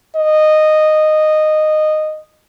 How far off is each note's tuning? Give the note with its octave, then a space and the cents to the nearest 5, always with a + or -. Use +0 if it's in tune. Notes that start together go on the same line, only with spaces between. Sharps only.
D#5 -10